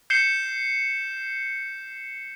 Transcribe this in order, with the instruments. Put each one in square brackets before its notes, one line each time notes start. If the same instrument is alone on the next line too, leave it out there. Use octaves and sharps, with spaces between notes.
[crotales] G6 C7 C#7 E7 G7